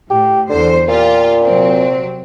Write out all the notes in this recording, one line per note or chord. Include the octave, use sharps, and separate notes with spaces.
A2 G4
E2 D3 C5
A#2 F4 G4
C3 F#3 C4